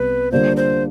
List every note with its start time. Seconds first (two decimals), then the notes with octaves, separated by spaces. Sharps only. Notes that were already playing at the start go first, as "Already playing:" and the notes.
Already playing: C2 G3 B3 B4
0.32 D3 G3 A#3 D4 F4 C5
0.57 C5